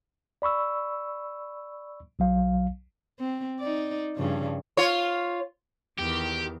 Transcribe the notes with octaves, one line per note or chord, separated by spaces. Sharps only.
D5 B5 C#6 E6
B1 F#3 F5
C4
D#4 D5
G2 C#3 F3
F4 C#5
E2 D#3 G4